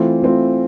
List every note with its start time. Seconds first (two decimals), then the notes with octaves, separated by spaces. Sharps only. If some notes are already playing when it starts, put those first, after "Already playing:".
Already playing: E3 A3 C4 F4
0.22 E3 A3 C4 F4